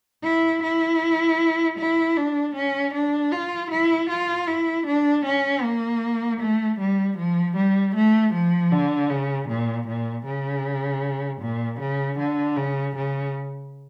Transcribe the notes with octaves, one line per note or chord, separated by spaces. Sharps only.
E4
E4
E4
D4
C#4
D4
F4
E4
F4
E4
D4
C#4
A#3
A3
G3
F3
G3
A3
F3
D3
C#3
A#2
A#2
C#3
A#2
C#3
D3
C#3
C#3